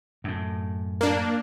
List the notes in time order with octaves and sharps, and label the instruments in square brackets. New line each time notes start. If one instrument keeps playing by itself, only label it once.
[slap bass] F#2 A2
[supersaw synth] A#3 D4